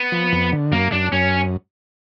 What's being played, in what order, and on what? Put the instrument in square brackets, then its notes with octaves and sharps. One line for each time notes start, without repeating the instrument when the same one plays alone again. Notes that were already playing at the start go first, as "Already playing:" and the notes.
Already playing: [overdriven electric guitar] B3
[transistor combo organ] F3
F2
D3
[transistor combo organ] F#2 [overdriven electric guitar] A#3
[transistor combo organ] F#2 [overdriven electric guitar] D4
[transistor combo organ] F#2 [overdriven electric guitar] C#4